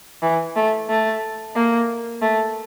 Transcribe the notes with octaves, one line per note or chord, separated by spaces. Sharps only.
E3
A3
A3
A#3
A3